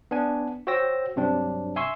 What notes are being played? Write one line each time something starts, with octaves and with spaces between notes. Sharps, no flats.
B3 D4 G#5
F#4 C5 C#5 G5 E6 A#6
G2 C3 F#3 C4 D4
E5 G#5 C6 C#6 E6